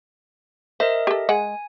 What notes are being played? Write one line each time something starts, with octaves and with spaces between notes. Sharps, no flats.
A#4 C5 D#5 E5
G4 A4
G#3 F#5 G#5